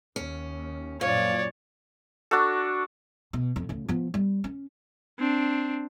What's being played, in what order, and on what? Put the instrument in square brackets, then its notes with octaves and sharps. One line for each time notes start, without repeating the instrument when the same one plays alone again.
[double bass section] D#2 [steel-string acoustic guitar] C#4
[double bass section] F#2 A#2 [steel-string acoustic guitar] F3 [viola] C#5 D5
[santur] D4 F#4 A4
[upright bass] B2
F2
D2 C#3
F3 B3
G3
C#4
[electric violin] C4 D4